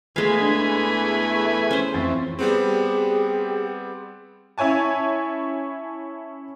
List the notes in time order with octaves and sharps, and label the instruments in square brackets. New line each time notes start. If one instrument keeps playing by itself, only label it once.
[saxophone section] E2 A3 [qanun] G#3 F5 [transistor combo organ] G#4 B4 G#5
[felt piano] D4
[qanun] C#4 C5
[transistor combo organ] F2 E3 [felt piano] C4 A6
[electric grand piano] G3 B3 C4 [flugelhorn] G4 [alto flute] G#4
[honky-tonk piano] C#4 E4 C#5 G#5 A5